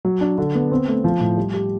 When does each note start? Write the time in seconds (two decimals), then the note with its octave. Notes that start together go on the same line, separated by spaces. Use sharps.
0.05 F#3
0.21 D4
0.38 D3
0.55 B3
0.72 C4
0.88 A3
1.04 F3
1.20 A2
1.37 G3
1.53 G4